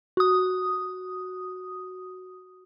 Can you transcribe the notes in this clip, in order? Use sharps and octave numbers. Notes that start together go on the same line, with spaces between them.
F#4 D#6